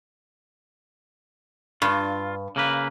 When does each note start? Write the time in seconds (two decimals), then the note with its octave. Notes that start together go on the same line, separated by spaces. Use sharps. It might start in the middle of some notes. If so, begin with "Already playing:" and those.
1.82 G2 F4
2.56 C#3 A#3 B4